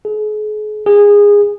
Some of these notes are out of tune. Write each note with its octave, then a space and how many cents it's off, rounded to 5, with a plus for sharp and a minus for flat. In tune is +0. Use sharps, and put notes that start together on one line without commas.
G#4 +40
G#4 -20